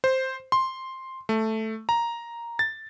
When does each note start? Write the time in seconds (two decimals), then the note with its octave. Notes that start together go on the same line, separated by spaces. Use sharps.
0.04 C5
0.52 C6
1.29 A3
1.89 A#5
2.59 A6